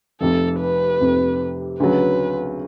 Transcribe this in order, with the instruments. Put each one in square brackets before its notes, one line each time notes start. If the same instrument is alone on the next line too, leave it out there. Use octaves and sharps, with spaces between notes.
[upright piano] F1 F2 C3 [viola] A4
[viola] B4
[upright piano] F1 F2 C3
[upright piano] D2 C#3 F#3 [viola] B4